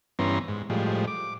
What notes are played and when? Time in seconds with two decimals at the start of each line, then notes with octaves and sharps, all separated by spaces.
0.19 G2 E3 B3 C#4 A#5 C6
0.48 G#2
0.70 A2 F3 G3 G#3
1.07 D6